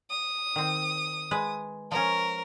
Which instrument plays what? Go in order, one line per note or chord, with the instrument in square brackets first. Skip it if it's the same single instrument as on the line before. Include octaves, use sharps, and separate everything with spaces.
[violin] D#6
[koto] D#3 C4
G#3 B4
[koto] F3 C#4 [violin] A#4